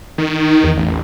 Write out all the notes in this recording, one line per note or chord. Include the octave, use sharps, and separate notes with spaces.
D#3
E2
A1